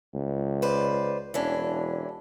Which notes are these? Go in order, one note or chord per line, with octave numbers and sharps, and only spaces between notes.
C#2
B4 C5 D5
E1 E3 C#4 D4